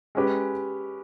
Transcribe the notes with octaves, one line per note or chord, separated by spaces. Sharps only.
G#3 C#4 G4 B4